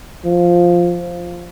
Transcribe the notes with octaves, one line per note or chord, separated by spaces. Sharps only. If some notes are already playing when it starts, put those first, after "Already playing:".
F3